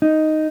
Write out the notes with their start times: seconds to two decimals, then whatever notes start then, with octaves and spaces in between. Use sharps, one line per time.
0.02 D#4